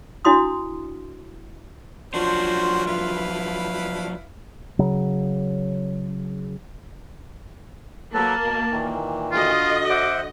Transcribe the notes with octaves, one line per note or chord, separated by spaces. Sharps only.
D4 E4 F#4 C6 D#6
F3 F#3 C#4 D4 F4 F#4 C5
E4 B4 F5
C#3 F#3
F#3 A#3 A4 B4 A5
B2
A#2 D#3 E3
D3 F4 F#4 D#5
C5 E5 F#5 D6